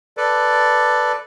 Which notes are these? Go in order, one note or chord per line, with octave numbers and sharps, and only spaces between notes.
A4 B4 D5